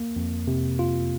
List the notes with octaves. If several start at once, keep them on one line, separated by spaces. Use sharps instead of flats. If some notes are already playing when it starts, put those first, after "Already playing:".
Already playing: A#3
F2
C3
F4